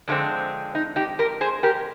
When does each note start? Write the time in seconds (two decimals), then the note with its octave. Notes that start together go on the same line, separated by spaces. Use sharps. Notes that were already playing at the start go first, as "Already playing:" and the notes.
0.08 F2 D3 G#3 C4 D4
0.75 D#4
0.96 D#4 G4
1.19 G4 A#4
1.41 G#4 C5
1.63 G4 A#4